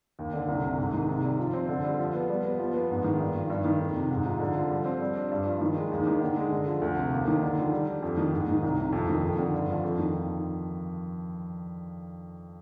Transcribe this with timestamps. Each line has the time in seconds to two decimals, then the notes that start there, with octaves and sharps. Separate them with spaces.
0.19 D#2
0.34 D3
0.48 C2
0.64 C3
0.78 G#2
0.93 D#3
1.09 C3
1.23 G3
1.39 F3
1.54 C4
1.69 D3
1.84 G3
1.99 F3
2.14 B3
2.30 G3
2.45 B3
2.59 F3
2.74 B3
2.90 G#2
3.04 D#3
3.20 G2
3.35 F3
3.50 G2
3.64 D#3
3.80 F2
3.96 C3
4.11 G#2
4.26 F3
4.40 D3
4.56 F3
4.70 G3
4.85 C4
5.01 G3
5.15 D4
5.31 G2
5.46 F3
5.61 D#3
5.76 G#3
5.92 D#2
6.07 D#3
6.21 D3
6.36 G#3
6.52 D3
6.67 F3
6.82 D2
6.97 C3
7.13 D#2
7.27 D#3
7.43 D3
7.57 F3
7.72 G3
7.88 D4
8.03 F2
8.17 D#3
8.32 G#2
8.48 D#3
8.62 C2
8.78 C3
8.93 F2
9.09 D#3
9.23 F2
9.39 D3
9.54 G2
9.69 F3
9.84 F2
9.99 D#3